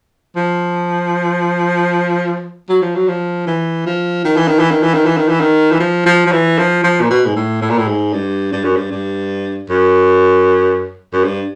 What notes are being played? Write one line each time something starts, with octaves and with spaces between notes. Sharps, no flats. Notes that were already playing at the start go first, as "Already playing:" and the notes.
F3
F#3
F3
F#3
F3
E3
F3
D#3
E3
D#3
E3
D#3
E3
D#3
E3
D#3
E3
D#3
E3
F3
F3
F3
E3
F3
F3
A#2
B2
G#2
A2
A2
A#2
A2
G#2
G2
G2
F#2
G2
G2
F#2
F#2
G2